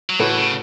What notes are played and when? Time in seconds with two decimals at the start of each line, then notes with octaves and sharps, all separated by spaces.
0.10 F#3
0.19 A2 E3 A3 F#4 B4
0.37 C#3